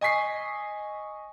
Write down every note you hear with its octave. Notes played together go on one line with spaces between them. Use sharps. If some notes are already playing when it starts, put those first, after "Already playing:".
D#5 G#5 C#6 B6 C7